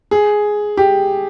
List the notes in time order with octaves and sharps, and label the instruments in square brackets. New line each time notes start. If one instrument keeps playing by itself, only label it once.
[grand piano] G#4
G4